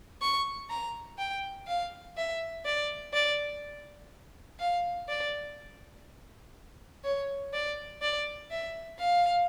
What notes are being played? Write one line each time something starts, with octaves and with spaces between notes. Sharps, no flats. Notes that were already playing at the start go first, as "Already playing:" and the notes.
C#6
A#5
G5
F5
E5
D5
D5
F5
D5
C#5
D5
D5
E5
F5